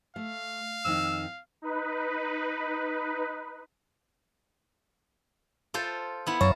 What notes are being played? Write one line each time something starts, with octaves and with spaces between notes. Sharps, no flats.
A3 F5
F2 D#3 D#4 E6
D#4 B4
F4 A4 C5
B3 E4
F#2 C#5 F5 A5 A#5